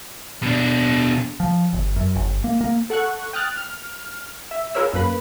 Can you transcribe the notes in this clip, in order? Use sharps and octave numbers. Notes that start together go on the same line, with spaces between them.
B2 D4
F3
G1
F#2
G1
A#3
A#3
A4 F#5 C#6 F#6
G5 D#6 F6 F#6 A6
F6
E5
F4 G#4 A#4 B4 C#5 E6
F#2 A#3 B4 B5